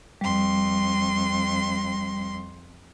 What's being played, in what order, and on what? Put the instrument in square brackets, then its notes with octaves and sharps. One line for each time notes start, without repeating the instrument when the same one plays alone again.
[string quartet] F2 C6 [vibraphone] G3